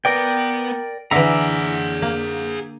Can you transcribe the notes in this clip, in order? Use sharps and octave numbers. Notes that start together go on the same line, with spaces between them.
B3 A#4 B4 D5 G5
D3 E3 G#4 D5 E5 F#5 A#5
A#3